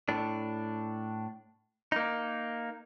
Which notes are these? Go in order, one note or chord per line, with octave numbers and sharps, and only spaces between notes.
A2 D4
A#3 D#4